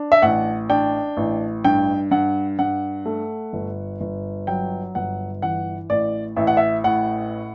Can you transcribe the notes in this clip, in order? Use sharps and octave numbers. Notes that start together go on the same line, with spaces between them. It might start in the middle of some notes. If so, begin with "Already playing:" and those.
Already playing: D4
E5
A1 F#5
D4 G5
A1
G2 G5
G2 F#5
G2 F#5
A3
G1
G1
F#3 G5
G1 F#5
E3 F#5
A1 D5
A1 E5
F#5
E5
A2 F#5